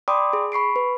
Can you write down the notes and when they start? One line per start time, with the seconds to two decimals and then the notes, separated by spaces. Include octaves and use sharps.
0.08 D5 G5 B5 C6 D6 D#6
0.33 G#4
0.52 B5 C#6 C7 D7
0.76 B4